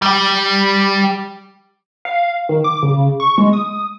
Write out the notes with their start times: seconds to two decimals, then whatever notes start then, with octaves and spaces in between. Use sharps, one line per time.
0.02 G3 G4
2.05 F5
2.49 D#3
2.64 D6
2.83 C#3
3.20 C#6
3.38 G#3
3.53 D#6